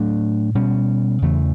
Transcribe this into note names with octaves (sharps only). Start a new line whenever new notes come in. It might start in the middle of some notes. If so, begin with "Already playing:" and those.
Already playing: A2 F#3 A3 D4
B2 G3 C#4
E2 C#3 E3 A3